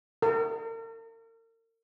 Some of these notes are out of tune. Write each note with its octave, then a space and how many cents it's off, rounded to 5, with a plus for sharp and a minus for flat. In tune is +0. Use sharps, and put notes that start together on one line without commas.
A#4 -40